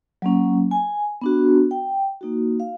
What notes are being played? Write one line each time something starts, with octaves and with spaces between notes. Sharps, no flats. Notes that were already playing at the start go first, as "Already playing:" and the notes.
F#3 A#3 C#4
G#5
B3 D4 F#4
G5
A#3 D#4 F#4
F5